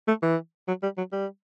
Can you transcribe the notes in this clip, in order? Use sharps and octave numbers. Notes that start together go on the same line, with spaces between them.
A3
E3
F#3
G3
F#3
G3